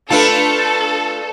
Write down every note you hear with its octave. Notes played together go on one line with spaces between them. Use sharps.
A3 D4 F4 A4 B4 A5